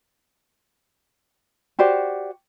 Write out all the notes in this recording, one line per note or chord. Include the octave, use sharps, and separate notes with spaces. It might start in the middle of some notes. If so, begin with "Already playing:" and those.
F#4 G4 C5 D5